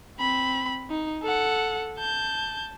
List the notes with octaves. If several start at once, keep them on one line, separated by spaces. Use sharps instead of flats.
C4 B5
D#4
A4 F#5
A5 G6